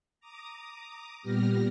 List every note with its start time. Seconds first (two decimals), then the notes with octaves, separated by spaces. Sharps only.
0.20 A#5 D6 D#6
1.21 A#2 G3 B3 G4 F6 A#6